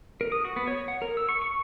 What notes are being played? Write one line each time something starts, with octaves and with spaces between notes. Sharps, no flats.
A#4
D#6
F#4
B3
C#5
F#5
A#4
E6
C#6
C#6